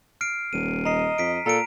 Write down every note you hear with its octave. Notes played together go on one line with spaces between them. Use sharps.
F6 C7 D7
D#1 D#7
D#5 A#5 C7
F2 B6 D7
A#2 A4 A#5 D7